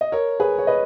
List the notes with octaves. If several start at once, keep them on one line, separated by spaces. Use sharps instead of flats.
D#5
A#4 C#5
G#4 B4
C#5
B4 D#5